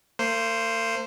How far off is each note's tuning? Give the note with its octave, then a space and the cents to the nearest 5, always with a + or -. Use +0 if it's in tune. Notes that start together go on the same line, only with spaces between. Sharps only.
A#3 -45 C5 +0